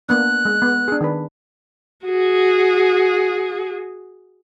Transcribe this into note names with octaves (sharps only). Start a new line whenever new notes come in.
A#3 B3 D4 F#6
G#3
B3
D4 G#4
D#3 D4 B4
F#4 G#4